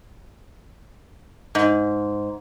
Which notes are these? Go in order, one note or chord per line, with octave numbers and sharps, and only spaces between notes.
G#2